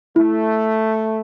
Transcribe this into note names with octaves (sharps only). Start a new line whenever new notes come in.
A3 E4